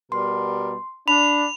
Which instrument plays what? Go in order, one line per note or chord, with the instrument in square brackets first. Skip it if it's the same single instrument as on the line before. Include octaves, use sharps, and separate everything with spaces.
[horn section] B2 G3 A#4 [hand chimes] C6
[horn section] D4 [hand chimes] B5 [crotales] F7